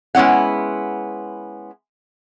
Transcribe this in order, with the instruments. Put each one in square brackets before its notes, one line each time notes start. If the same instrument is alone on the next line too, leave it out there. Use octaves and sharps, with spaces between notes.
[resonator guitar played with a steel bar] G#3 B3 C#4 E4 F#5